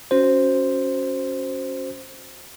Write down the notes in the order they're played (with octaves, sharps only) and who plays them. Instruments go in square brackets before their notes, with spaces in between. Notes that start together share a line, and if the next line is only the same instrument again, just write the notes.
[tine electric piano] C#4 F#4 C5